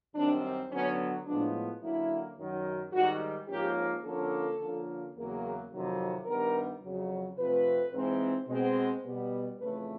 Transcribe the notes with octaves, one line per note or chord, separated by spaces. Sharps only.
F#2 D#3 G3 C4 D4
D3 F#3 B3 C#4
A2 F3 G#3 B3 D4
D3 F#3 A#3 C#4 E4
F#2 D#3 F#3
G#2 D#3 G3 F#4
G#2 F3 A#3 C#4 G4
D3 F3 A#3 C#4 A4
D3 F3 A#3 C#4
E2 C#3 F#3 A#3
F2 C3 D#3 F#3
G2 D#3 G3 B3 A#4
F2 C#3 F#3
C3 F3 A3 C4 B4
G#2 E3 G#3 C4
B2 G#3 C4
B2 G3 B3
F2 C#3 E3 A3 C#4 B4